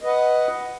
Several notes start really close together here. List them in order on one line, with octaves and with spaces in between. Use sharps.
D#5 B4 F#5